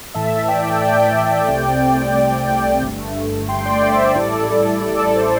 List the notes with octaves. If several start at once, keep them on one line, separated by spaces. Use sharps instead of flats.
A2 E3 A3 E5 A5
D5 G5
D5 G5
C2 C3 A3 C4
G1 G2 D3 A3
G5 C6
D5 G5
C5 E5
C5
A1 A2 G3 E4 A4 D5
A4 D5
A4
C5